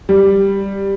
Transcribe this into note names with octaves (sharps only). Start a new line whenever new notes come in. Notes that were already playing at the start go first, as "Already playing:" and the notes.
G3